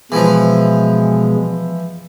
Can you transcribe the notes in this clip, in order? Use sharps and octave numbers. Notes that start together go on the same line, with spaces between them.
B2 E3 F3 G#3